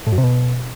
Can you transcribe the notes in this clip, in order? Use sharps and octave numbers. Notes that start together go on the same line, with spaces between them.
A2
F#2
C3
B2